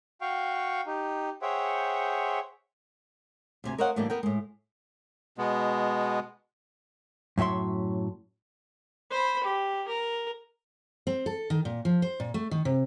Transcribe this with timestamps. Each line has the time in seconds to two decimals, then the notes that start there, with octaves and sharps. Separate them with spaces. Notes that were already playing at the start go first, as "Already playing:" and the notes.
0.21 F#4 F5 G5 C#6
0.86 D#4 G4
1.42 G#4 C5 C#5 E5 F#5 G5
3.64 D2 C3 G#5
3.78 A#4 C5 C#5 D#5 F5 F#5
3.96 A2 E3 G3 A3 A#3 D4
4.10 B3 A#4 G5
4.23 A2 G#3
5.38 B2 G#3 B3
7.38 F#2 A2 F#3 E5 C6
9.11 C5 B5
9.43 G4
9.88 A#4
11.07 C4
11.26 A4
11.50 D#3
11.65 A#2
11.85 F3
12.02 C5
12.20 A#2
12.34 A3
12.51 D#3
12.65 C3